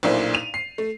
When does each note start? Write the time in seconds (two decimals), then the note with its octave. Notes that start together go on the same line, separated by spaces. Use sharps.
0.03 B1 A#2 D4 E4 C5
0.34 D#7 F7
0.54 C7
0.78 A3